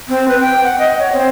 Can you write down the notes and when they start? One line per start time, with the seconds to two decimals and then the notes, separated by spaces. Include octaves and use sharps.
0.08 C4
0.28 B4
0.40 G5
0.64 F#5
0.79 D#5
0.99 C#5
1.13 C4